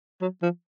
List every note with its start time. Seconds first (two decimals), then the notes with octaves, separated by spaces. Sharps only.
0.21 F#3
0.42 F3